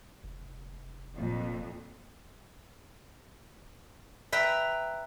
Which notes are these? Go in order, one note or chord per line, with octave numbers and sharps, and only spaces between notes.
F1
F2 A#2
B4 E5 G5 A#5